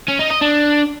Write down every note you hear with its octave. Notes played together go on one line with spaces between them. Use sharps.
C#4
D#4
D#5
D4